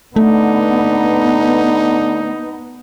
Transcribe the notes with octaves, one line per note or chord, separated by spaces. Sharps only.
D3 A3 B3 D#4